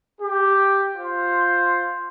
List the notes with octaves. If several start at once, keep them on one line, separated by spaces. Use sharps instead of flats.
G4
F4 C5